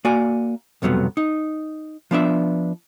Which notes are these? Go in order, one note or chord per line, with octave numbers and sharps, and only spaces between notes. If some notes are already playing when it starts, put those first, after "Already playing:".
A#3 F#4 D5 G#5
B1 F2 C3 F#3 G3 B3
D#4
F3 B3 D4 E5